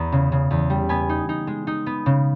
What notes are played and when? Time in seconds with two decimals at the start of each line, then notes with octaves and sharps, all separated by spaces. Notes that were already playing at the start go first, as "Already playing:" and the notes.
Already playing: E2 B3 A#5
0.12 C#3
0.32 C#3
0.51 E2
0.70 G3
0.89 B3 G#5 B5
1.09 D#4
1.29 D#4
1.47 G#3
1.67 D#4
1.86 B3
2.06 C#3